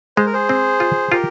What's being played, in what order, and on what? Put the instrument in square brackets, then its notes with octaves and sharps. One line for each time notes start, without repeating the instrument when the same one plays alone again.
[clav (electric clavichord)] G#3 [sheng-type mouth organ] C5
[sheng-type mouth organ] A#4
G#4 C5
[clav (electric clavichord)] C4
F4
[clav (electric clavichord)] F4 [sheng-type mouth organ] G4 A#4